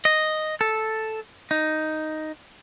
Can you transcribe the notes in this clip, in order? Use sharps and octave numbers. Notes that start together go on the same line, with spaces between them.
D#5
A4
D#4